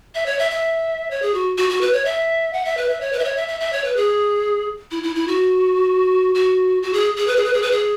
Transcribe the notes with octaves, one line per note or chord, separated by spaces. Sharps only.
E5
C#5
E5
E5
C#5
G#4
F#4
F#4
F#4
B4
C#5
E5
F#5
E5
B4
E5
C#5
B4
E5
C#5
E5
E5
E5
C#5
B4
G#4
E4
E4
E4
F#4
F#4
F#4
G#4
G#4
B4
G#4
B4
G#4
B4
G#4